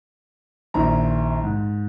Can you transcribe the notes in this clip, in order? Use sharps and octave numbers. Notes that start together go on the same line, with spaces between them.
A#1 D#2 E4 A#5
G#2